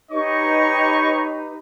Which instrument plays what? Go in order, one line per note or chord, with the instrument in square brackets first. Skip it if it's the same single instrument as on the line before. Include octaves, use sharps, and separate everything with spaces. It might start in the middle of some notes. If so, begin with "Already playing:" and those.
[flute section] D#4 G4 B4 [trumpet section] C#5 D#5 C#6